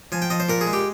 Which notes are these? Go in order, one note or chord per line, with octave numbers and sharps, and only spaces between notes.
F3 G#5
G5
F3 D#5
C5
A#2 A#4
G#4
G#3
G4